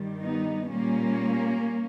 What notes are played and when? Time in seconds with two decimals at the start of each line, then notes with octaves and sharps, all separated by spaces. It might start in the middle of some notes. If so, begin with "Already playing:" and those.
Already playing: G2 D#3 G3
0.23 B3 D#4
0.71 A#2 G3 A#3 C#4